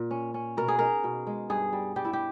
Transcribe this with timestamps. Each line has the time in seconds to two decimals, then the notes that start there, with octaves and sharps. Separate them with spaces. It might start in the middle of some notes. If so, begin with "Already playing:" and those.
Already playing: A#2
0.11 C#4
0.34 C#4
0.57 B2 A#4
0.68 G#4
0.79 D#4 A#4
1.04 B2
1.27 G#3
1.50 G2 G#4
1.73 G3
1.96 G3 G4
2.05 E4
2.13 G4